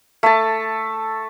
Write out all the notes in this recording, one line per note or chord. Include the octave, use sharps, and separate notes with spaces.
A3 A5